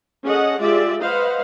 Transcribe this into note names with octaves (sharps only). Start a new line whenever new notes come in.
C#4 G#4 A4 D#5 F#5
G#3 F4 G4 G#4 D5 E5
B4 C5 D#5 F5 F#5